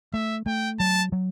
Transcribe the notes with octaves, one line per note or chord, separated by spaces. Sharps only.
A3 E5
A3 G5
F#3 A5
F#3